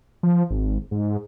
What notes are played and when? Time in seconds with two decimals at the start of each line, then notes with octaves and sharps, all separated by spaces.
0.23 F3
0.50 G#1
0.91 G#2